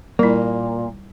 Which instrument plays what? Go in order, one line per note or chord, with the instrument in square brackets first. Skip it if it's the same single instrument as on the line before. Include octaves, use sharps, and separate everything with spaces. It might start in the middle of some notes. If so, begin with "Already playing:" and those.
[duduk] A#2 [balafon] G3 E4 [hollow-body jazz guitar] A#3